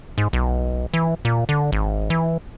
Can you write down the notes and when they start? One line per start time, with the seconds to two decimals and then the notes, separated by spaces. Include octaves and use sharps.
0.18 G#2
0.33 B1
0.94 E3
1.25 A#2
1.49 D3
1.72 G#1
2.10 E3